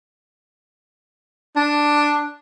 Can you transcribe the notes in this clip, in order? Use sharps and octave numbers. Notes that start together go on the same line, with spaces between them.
D4